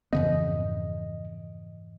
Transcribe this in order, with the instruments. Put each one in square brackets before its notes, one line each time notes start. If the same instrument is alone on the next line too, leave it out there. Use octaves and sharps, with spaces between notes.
[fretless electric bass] F2 C#3 B3 [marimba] G#2 E3 [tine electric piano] D#5